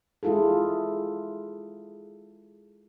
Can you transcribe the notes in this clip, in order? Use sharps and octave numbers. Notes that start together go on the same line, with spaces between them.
G#3 E4 F4 G#4 A4